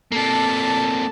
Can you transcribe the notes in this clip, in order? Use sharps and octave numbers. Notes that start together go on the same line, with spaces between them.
C3 A#3 A4 A5